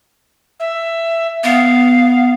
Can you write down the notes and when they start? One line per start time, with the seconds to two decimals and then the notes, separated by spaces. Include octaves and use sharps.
0.59 E5
1.44 B3 F5